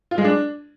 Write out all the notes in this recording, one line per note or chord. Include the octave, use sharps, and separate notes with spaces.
F4
G#3
D4